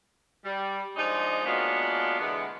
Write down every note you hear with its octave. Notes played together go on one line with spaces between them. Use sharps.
G3
F3 G#3 D4 D#4
F#3 G#3 A#3 B3 D4 F4
B2 D3 E3 G#3 B3